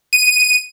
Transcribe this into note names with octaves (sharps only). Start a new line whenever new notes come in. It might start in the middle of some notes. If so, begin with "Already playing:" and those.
D#7